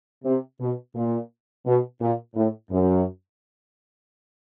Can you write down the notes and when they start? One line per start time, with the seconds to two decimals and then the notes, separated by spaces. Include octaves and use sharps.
0.24 C3
0.60 B2
0.95 A#2
1.65 B2
2.00 A#2
2.34 A2
2.70 F#2